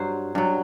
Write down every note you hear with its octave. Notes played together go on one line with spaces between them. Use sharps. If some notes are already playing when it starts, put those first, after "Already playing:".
Already playing: G2 F#3 C5
G2 F#3